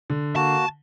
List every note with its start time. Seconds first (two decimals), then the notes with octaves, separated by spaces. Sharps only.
0.10 D3
0.36 A#3 F#4 A5